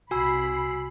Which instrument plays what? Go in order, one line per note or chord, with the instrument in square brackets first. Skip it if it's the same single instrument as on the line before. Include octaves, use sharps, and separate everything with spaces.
[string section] C2 B5 C7 [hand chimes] F#4 G#5 E6